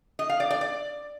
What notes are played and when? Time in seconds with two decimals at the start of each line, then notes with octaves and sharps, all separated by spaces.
0.19 D#5
0.29 F5
0.40 D5
0.51 D5
0.61 D5